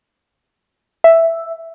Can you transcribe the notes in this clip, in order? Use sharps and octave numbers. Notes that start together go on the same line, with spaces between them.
E5